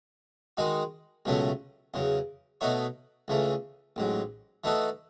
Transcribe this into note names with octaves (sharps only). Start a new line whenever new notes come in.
D#3 G#3 D#4 F#4
C#2 B2 F#3 A3 C#4
E2 C#3 F#3
B2 A3 D#4 F#4 C#5
C#2 C#3 E3 A3
A1 G#2 F#3
E3 A3 D#4 F#4 A4